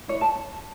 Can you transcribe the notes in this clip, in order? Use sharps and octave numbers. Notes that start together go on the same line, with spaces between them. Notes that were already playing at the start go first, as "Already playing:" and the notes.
E4 C#5
A5